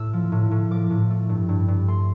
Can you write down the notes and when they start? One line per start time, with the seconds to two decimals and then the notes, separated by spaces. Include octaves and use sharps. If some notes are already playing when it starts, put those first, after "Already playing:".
Already playing: A2 E6
0.13 F3
0.32 A2
0.51 A2
0.71 F3 D6
0.90 A2
1.10 A3
1.29 G2
1.49 G2
1.68 G2
1.88 A3 C6